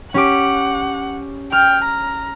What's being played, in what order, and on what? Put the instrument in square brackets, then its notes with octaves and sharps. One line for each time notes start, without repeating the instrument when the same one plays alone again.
[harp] C#4 G4 D6 [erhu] F#5
[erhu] G5 [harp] F6
[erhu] A#5